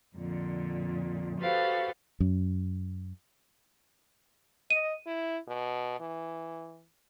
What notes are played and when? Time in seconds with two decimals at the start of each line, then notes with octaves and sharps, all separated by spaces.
0.15 F2 A#2 D3
1.40 F#4 G4 A4 B4 C5 F5
2.20 F#2
4.70 D#5 D#7
5.06 E4
5.48 B2
6.00 E3